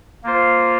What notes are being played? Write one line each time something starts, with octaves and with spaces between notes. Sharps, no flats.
A#3 F4 C5